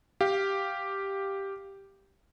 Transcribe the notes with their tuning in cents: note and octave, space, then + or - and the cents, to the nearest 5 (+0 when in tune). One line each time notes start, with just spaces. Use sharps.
G4 +0 F5 +0